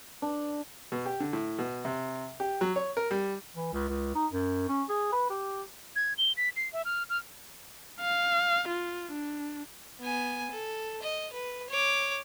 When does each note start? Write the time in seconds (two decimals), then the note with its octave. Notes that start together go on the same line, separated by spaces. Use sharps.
0.22 D4
0.92 B2
1.06 G4
1.20 D3
1.33 A2
1.59 B2
1.85 C3
2.40 G4
2.61 F#3
2.76 C#5
2.97 A#4
3.11 G3
3.56 E3
3.73 C#2
3.88 C#2
4.15 D#4
4.32 F#2
4.69 C#4
4.89 G#4
5.12 B4
5.30 G4
5.96 G#6
6.18 G7
6.37 B6
6.56 C7
6.73 E5
6.85 F6
7.10 F6
8.00 F5
8.68 F4
9.12 D4
10.00 B3 G#5
10.52 A4
11.02 D#5
11.33 B4
11.70 C#5 D6